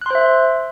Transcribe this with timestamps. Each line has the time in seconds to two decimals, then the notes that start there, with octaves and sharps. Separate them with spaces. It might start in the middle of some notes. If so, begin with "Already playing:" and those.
0.01 F#6
0.06 C6
0.10 C5
0.15 E5